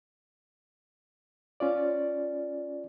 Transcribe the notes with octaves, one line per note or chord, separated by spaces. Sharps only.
C#4 F4 D5